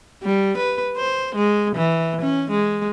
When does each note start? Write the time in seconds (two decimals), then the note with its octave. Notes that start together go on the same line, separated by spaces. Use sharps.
0.23 G3
0.57 B4
0.97 C5
1.35 G#3
1.75 E3
2.22 C#4
2.51 G#3